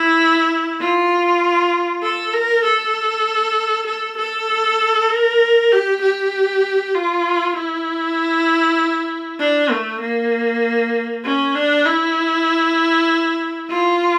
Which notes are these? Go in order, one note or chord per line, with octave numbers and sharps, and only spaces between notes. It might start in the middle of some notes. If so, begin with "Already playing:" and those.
Already playing: E4
F4
A4
A#4
A4
A4
A4
A#4
G4
G4
F4
E4
D4
A3
A#3
C#4
D4
E4
F4